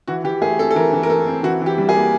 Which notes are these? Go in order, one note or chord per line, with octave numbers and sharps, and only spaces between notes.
E3 F#4
E3 G4
A3 G#4
C4 A4
A4
E3 A#4
E3
A#4
A3 A4
C4
E3 F#4
E3 G4
G3
G#4
A#3